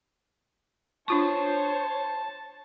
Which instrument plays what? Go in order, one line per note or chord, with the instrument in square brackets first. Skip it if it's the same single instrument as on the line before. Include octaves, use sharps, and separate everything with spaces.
[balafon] D4 F4 C#6 [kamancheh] C5 C#5 [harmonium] A5